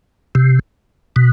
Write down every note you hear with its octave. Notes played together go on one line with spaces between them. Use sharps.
C3
B2